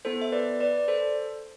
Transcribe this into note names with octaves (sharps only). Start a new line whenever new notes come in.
B3 E4 A4 C5
E5
B4 D5
B4 D5
D5
A4 C5